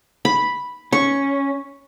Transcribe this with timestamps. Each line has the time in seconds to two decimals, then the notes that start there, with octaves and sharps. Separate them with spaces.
0.25 B5
0.93 C#4 C#6